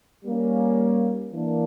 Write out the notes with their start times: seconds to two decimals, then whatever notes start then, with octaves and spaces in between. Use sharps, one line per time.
0.25 G3 A#3 C#4
1.32 E3 A#3 D4